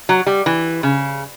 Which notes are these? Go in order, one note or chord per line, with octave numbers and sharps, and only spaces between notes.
F#3
G3
E3
C#3